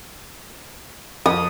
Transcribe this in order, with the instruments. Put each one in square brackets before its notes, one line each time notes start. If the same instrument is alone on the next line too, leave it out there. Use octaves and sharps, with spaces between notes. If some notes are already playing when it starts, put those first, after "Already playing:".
[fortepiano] F2 [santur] D#6